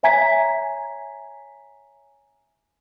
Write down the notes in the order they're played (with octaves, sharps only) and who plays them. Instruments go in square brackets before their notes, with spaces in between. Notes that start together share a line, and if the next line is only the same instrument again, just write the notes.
[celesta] C#5 E5 G#5 A#5 G#6 B6